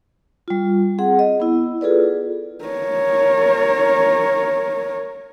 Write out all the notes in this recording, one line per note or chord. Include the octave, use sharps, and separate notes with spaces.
G3 F4
C4 G#4 F#5
D#5
B3 E4
F4 G#4 A4 B4 D5
A#4 C#5